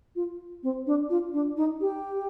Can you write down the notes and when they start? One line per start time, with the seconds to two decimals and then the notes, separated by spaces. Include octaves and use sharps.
0.16 F4
0.63 C4
0.87 D4
1.10 F4
1.33 D4
1.57 D#4
1.81 G4